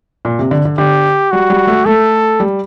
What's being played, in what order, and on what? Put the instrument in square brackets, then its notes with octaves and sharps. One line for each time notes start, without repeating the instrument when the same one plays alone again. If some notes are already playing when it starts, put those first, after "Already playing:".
[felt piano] A#2
C3
D3
D3
[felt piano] D3 [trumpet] G4
[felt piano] G3 [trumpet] F#4
[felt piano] G3
A3
[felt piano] A3 [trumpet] A4
[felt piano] G3